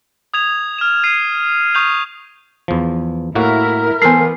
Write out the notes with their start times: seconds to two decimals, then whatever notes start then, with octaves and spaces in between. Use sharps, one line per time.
0.34 D#6 G#6 F7
0.78 F6 E7
1.04 G#6 C7 D#7
1.75 C#6 D#6 G6 F7
2.68 E2 F3
3.35 A2 A#3 E4 F#4 A#4
4.02 E3 B3 A4 C5 G#5 C7